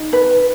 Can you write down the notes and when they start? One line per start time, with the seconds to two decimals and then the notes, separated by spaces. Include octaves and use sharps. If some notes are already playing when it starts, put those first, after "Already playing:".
Already playing: D#4
0.13 B4